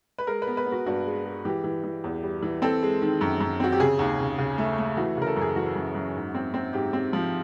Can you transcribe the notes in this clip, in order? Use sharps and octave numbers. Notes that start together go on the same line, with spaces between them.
B4
G#3 A#4
B4
B3
B4
B3
F#4
G2 F#4
G#3
G#3
E3 G4
E3
E3
E2
G3
E3
C4 A4
G#3
D#3
F#2
F#2
C4 F#4
G4
C#3 G#4
D#2
C#3
C#3
A3
A3
E3 F#4
C#3 A#4
A4
F#2 G#4
E3 F#4
F#2
F#2
G#2
C4
C4
G#2 G4
C4
F3